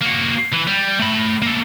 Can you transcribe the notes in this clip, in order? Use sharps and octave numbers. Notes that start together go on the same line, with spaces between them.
A#3 F#4
E3
G3
A3 B5
A#3 A4